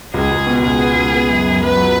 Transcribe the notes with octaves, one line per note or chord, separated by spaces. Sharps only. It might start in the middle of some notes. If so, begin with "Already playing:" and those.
C#2 G#4
C#2
B2
C#2 G#4
B3
C#2
B3
F#2
F#2
F#2 B4
F#3